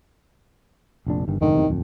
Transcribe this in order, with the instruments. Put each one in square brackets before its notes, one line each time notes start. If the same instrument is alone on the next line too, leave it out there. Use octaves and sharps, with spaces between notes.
[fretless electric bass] F1 A#1 D4
G1 G2 D#3
[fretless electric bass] F1 G#2 D3 [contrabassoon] D#3
[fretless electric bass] F1 E2 C3
D1 F2